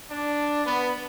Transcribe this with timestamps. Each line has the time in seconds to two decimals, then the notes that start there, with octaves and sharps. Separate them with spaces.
0.10 D4
0.64 B3